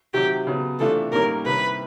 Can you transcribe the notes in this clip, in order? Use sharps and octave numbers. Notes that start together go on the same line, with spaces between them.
C3 D#3 F#3 G4
C#3 F#3 B3
C3 E3 A3 D4 F4 A4
G#2 D#3 G3 A#3 C#4 A#4
C2 C3 D#3 B4